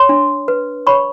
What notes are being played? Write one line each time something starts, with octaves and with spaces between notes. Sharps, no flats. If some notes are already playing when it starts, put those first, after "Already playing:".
Already playing: C#5 C6
D4
B4
C#5 B5 C#6